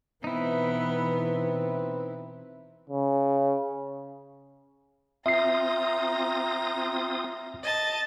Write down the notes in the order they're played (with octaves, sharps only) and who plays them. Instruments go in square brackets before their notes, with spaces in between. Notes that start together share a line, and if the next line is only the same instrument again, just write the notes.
[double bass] B2 E3 [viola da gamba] B3 [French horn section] C4 B4 [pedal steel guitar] D#4 E4
[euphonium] C#3
[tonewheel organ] C4 F4 D#6 [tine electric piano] E5 C7 [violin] A#5
[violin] D#5 A5